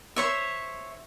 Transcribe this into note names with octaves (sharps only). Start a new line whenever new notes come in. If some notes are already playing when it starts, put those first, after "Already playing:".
C5 C#5 E5